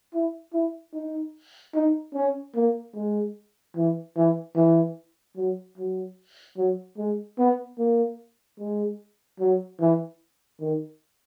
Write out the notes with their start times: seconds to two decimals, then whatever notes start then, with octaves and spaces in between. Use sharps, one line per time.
0.14 E4
0.53 E4
0.94 D#4
1.75 D#4
2.14 C#4
2.55 A#3
2.95 G#3
3.76 E3
4.16 E3
4.56 E3
5.37 F#3
5.78 F#3
6.57 F#3
6.98 G#3
7.39 B3
7.78 A#3
8.59 G#3
9.40 F#3
9.80 E3
10.60 D#3